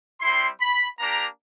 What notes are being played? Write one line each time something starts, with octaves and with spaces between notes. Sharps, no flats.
G3 C4 E4 C6
B5
A#3 D4 G4 A#5